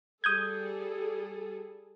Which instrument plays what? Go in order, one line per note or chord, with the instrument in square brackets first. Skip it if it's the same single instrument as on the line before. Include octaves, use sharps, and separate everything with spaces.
[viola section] G3 G#4 A4 [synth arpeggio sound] D#6 G6 G#6